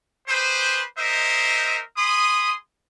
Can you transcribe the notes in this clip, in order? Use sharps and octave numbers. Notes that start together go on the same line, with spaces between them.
G4 G#4 B4 C5
A#3 D#4 A#4 C5 D#5 E5
G#4 B5 C6 D#6